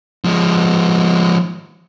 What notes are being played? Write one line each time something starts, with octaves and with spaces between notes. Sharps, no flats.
F3 G#3